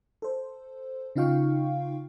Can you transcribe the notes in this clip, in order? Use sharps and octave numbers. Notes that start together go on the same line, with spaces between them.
A4 C5
C#3 D#4 F4 F5 G5 C#6